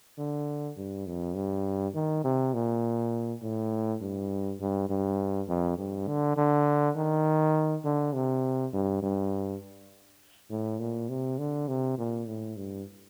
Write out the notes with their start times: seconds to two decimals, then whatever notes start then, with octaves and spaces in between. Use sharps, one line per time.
0.18 D3
0.77 G2
1.06 F2
1.35 G2
1.95 D#3
2.24 C3
2.54 A#2
3.42 A2
4.01 G2
4.60 G2
4.89 G2
5.48 F2
5.78 G2
6.07 D3
6.37 D3
6.96 D#3
7.84 D3
8.14 C3
8.73 G2
9.03 G2
10.50 A2
10.79 A#2
11.09 C3
11.38 D3
11.68 C3
11.98 A#2
12.27 A2
12.56 G2